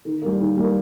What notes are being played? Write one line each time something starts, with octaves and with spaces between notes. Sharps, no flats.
D#3
G3 A#3
D#3
G3 A#3